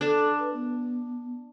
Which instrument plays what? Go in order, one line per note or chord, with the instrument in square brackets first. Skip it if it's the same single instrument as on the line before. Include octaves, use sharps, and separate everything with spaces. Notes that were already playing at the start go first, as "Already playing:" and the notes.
[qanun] D4 A5 [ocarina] A4
[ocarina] B4
B3